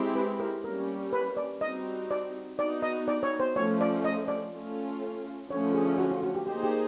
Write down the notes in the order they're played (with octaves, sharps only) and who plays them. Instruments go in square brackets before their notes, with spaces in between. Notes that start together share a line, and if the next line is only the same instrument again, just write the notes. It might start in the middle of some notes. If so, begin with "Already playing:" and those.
Already playing: [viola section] G#3 C4 E4 G4
[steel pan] B4
A#4
[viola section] G3 A#3 C#4 [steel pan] A#4
[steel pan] B4
D5
[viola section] G3 C4 D#4 F#4 [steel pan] D#5
[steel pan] D5
[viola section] B3 D#4 F#4 [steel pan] D5
[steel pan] D#5
D5
C#5
C5
[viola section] F3 A3 C#4 [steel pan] C#5
[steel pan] D5
D#5
D5
[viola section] A3 C#4 F4 A4
[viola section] D3 F3 A3 C#4 [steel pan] C#5
[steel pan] G#4
F#4
F4
F#4
G4
[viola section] A#3 D#4 G#4 C5 [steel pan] G4
[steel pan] G4